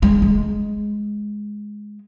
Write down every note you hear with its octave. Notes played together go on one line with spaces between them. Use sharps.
G#3
G#3